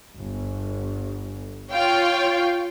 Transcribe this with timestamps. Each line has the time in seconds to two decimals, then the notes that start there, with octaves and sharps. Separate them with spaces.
0.18 G1
1.72 F4 C#5 F5 G5